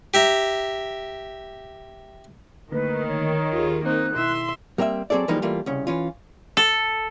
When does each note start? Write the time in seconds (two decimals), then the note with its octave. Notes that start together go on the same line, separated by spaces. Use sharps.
0.14 G4 E5 A#5
2.72 D3 D#3 A3 A#3 B4
3.08 C#5
3.52 D#2 F4 G4 G#4
3.85 A#3 C4 D#4 A#4 C5 F#6
4.16 B2 E4 E5 C6
4.78 G3 A#3 C4 F#4 E5
5.10 F#3 C4 G#4 A4 D5
5.28 E3 F3 G3 G#3 A#3 D#4
5.42 E3 G3 A3 A#3 F4
5.66 C2 C#3 C#4
5.87 E3 C#4 F4
6.57 A4